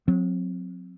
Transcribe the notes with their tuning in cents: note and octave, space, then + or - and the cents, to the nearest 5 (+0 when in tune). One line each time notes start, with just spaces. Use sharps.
F#3 -35 C4 +0